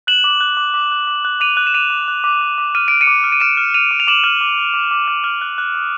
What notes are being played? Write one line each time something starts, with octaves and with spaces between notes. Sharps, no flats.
F#6 E7 F#7
D6
F#6
D6
D6
F#6
D6
F#6
D6 D#7 F7
F#6
E7
D6 D#7 F7
D6
F#6
D6
D6
D6
F6 D#7
F6 D7
C#7 D#7
D6
F6
D#7
F6 D7 E7
F6
F6 D#7 F7
D6
F7
D6 E7 F#7
F6
D6
D6
D6
D6
F6
F6
F#6
F#6
D#6